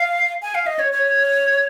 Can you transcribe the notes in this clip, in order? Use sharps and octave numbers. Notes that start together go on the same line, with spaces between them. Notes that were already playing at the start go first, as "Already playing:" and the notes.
Already playing: F5
G#5
F5
D#5
C#5
C#5